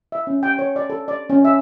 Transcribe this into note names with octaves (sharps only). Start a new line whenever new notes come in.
E5
C#4
G5
C#5
D5
A4
D5
C#4
E5